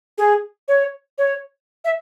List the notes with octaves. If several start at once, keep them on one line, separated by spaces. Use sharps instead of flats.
G#4
C#5
C#5
E5